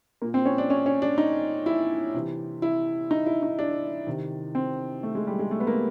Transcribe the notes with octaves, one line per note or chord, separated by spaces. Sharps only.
A#2 A#3
C4
C#4
D4
C#4
C#4
D4
D#4
E4
C3 E3
E4
D#4
E4
D#4
D4
C3 D#3
C4
A3
G#3
G3
G#3
A3
B3
A#3